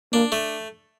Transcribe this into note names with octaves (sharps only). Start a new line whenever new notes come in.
A#3 D4
A3